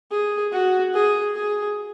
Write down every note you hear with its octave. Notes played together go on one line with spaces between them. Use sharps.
G#4
F#4
G#4
G#4